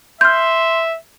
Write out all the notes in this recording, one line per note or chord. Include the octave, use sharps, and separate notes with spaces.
E5 C6 F6 G6